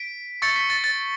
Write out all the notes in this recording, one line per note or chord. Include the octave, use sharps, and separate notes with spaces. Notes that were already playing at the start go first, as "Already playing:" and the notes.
Already playing: B6 D7
C#6 E6 G6 A6 C#7
B6
A6
A6